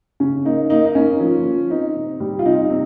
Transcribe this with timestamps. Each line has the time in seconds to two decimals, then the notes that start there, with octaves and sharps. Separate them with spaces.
0.20 C#3 C#4
0.45 A#3 D#4
0.70 A#3 D#4
0.85 D#4
0.95 A#3 C#4
1.20 F3
1.45 F3
1.70 C4 D#4
1.96 C3
2.20 G3
2.39 F4
2.46 C3 D#4
2.70 C3